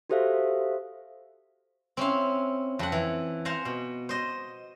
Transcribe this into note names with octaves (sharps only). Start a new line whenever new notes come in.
F#4 G4 A4 C5 E5 F5
C4 C#4 E4 F5
F2 F#5
E3
C5 F5 F#5 G#5 A#5
B2
C5 D#5